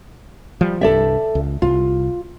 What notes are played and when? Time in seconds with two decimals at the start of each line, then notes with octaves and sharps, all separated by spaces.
0.61 F3 G3
0.81 C2 G2 A4 D5 E5
1.35 C#2
1.62 C2 F4